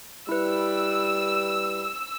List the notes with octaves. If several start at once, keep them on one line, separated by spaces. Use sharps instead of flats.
G3 E4 B4 E6